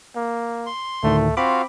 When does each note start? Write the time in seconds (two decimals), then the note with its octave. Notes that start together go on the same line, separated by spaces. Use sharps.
0.16 A#3
0.66 C6
1.03 D2 A2 D#3 A3
1.37 C4 F4 F#4 F5 B5 D6